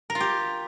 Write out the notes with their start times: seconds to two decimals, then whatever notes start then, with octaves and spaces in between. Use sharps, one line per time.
0.10 A#4
0.15 F4
0.20 G4